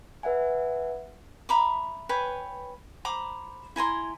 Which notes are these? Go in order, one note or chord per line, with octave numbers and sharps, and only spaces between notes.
B4 E5 F#5 G#5
E5 A#5 B5 D6
B4 C#5 G5 G#5
C5 A#5 B5 D6
E4 G#5 A#5 C6